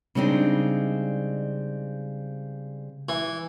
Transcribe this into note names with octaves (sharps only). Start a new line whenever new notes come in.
C#3 G3 G#3 C4 D4 D#4
E3